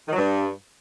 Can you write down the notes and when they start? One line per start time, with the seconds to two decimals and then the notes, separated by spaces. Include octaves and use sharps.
0.07 D#3
0.12 F#3
0.17 G2